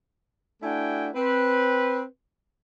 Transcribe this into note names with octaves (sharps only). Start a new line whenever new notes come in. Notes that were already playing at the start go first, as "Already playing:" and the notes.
A3 D4 E4 F#4 G5 G#5
C4 B4